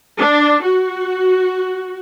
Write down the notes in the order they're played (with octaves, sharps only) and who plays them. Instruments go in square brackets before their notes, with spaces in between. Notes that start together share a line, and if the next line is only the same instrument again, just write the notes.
[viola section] D4
F#4